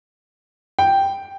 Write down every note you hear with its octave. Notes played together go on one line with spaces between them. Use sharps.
G5